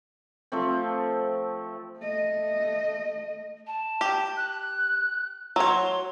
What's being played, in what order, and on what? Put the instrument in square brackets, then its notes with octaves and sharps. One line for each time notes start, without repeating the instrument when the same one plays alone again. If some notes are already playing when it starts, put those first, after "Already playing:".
[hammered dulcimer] F3 A3 C4
[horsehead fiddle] A3 D#5
[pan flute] A5
[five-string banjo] G4
[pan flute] F#6
[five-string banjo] F#3 C#5 [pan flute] C6